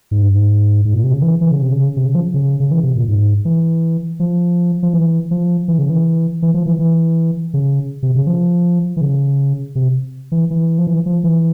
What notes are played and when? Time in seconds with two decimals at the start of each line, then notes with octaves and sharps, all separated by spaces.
0.11 G#2
0.23 G2
0.34 G#2
0.85 G#2
0.94 A#2
1.04 C3
1.13 C#3
1.22 E3
1.41 E3
1.51 C#3
1.62 C3
1.72 C#3
1.97 C3
2.06 C#3
2.15 F3
2.34 C#3
2.60 C#3
2.71 E3
2.83 C3
2.96 A#2
3.08 G#2
3.45 E3
4.20 F3
4.83 F3
4.94 E3
5.31 F3
5.68 E3
5.79 C#3
5.90 E3
6.42 E3
6.54 F3
6.66 E3
6.79 E3
7.54 C#3
8.03 C3
8.15 C#3
8.27 F3
8.97 E3
9.01 C#3
9.75 C3
10.32 E3
10.50 E3
10.78 F3
10.87 E3
11.06 F3
11.24 E3